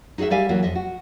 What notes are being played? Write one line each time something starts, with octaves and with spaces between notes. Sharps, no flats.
D#4 F#4 G#4 D#5 E5
G3 G4 D5 E5 F5 G#5
E3 F#3 A#3 E4 F#4
F2 D#5 E5
F#4